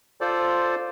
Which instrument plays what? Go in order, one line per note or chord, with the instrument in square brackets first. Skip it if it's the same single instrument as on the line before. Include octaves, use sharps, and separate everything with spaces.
[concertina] F4 A4 C5 D5